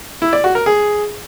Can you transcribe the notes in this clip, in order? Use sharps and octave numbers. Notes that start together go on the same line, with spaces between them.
E4
D5
F#4
A#4
G#4